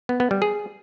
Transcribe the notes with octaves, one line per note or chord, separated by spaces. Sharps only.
B3
B3
G3
G#4